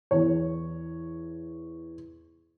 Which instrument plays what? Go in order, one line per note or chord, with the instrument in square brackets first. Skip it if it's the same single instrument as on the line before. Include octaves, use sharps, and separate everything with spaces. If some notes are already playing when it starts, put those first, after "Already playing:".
[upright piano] E2 C#5